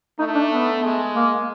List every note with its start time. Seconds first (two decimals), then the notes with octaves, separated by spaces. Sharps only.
0.19 A3 D#4
0.35 D4
0.51 B3
0.84 G#3
1.16 A#3